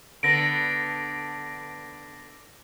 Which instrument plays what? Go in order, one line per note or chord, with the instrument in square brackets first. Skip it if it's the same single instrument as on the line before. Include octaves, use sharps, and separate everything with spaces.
[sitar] D3 B3 [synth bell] A#6 D7